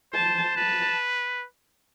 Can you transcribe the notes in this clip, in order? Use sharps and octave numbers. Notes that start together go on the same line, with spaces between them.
C5 A5
B4 A5